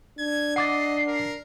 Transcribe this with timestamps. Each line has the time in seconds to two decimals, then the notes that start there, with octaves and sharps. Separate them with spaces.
0.19 D4 G#6
0.56 D#5 F#5 D6 A6 C7
1.07 A#4